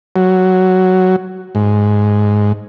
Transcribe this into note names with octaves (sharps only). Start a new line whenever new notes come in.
F#3
G#2